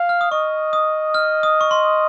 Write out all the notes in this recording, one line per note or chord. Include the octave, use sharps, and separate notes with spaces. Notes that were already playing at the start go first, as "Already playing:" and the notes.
Already playing: F5
F6
D#6
D#5 C#6
D#6
F6
D#6
C#6
C6